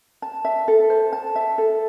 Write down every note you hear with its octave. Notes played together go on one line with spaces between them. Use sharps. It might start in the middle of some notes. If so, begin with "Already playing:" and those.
A5
E5
A4
C5
A5
E5
A4